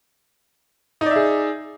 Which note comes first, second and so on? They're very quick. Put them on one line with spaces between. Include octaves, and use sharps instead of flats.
D#4 D5 E5 G#4